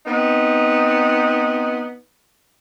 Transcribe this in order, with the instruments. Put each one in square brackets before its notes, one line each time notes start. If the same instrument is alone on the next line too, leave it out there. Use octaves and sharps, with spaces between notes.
[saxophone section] B3 C4 D#4